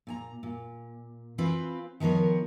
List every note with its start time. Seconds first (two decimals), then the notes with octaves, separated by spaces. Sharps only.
0.07 A#2 G#5 A#5
0.43 A#2
1.38 E3 C4 F4 B4 C5
2.00 D#3 F3 B3 A#4 C#5